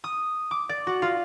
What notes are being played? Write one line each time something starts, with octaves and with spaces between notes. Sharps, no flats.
D#6
D6
D5
F#4
F4